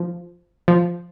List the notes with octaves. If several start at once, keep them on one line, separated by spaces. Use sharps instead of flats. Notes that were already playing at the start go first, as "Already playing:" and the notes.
Already playing: F3
F3